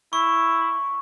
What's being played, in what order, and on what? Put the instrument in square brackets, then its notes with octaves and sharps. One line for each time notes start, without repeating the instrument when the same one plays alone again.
[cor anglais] E4 [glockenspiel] C#6